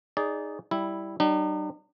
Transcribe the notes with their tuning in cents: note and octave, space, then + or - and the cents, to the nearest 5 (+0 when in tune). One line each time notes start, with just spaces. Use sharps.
D#4 +0 G#4 +0 D5 -20
G3 +0 E4 +0
G3 -35 D#4 -45